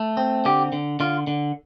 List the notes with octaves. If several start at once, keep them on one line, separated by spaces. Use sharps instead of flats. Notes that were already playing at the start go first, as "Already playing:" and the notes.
Already playing: A3
C4
D3 G4
D3
D3 F4
D3